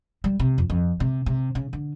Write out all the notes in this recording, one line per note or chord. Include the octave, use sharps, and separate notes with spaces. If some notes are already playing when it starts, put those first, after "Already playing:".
G3
C3
F2
F2
C3
C3
C#3
D3